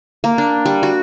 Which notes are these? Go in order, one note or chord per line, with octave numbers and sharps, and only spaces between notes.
A#3
D4
G3
F#4